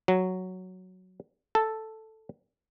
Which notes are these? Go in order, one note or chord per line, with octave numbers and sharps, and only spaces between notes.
F#3
A4